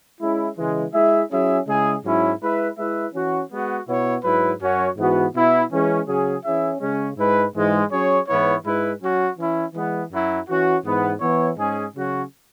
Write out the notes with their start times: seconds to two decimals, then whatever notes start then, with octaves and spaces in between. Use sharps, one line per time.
0.20 G#3 C#4 E4
0.57 C#3 E3 G#3
0.93 G#3 E4 G#4 E5
1.29 F#3 C#4 E4 G#4 E5
1.67 C#3 G#3 E4 G#4
2.03 G#2 F#3 C#4 E4
2.41 G#3 E4 B4 E5
2.77 G#3 E4 B4 E5
3.13 E3 C#4 F#4
3.50 G#3 B3 F#4
3.87 B2 B3 E4 C#5
4.23 G#2 F#3 E4 B4
4.60 F#2 F#3 C#4 F#4 C#5
4.97 G#2 E3 B3 F#4
5.34 B2 B3 E4
5.70 E3 G#3 C#4 G#4
6.07 C#3 F#3 C#4 G#4
6.44 E3 C#4 E4 G#4 E5
6.80 C#3 G#3 C#4
7.16 G#2 G#3 E4 B4
7.54 G#2 E3 G#3
7.91 F#3 C#4 G#4 C#5
8.27 G#2 E3 B3 E4 C#5
8.64 G#2 G#3 E4 B4
9.01 F#3 C#4 F#4
9.37 E3 C#4 E4
9.74 E3 G#3 B3
10.11 F#2 F#3 E4
10.47 E3 C#4 F#4
10.84 G#2 E3 B3
11.21 E3 B3 E4 C#5
11.57 G#2 G#3 C#4 G#4
11.95 C#3 F#3 C#4 F#4